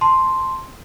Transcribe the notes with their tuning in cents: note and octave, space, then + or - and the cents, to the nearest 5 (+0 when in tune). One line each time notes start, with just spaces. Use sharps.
A5 +0 C6 +0